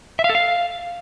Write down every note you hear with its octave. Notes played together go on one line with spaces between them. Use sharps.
E5
F5
A4
F5